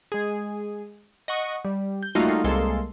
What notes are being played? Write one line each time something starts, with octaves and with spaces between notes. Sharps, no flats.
G#3 G#4
D#5 F#5 C#6
G3
G6
G3 A3 A#3 D#4 F4 F#4
C2 G#3 A#3 A4 C6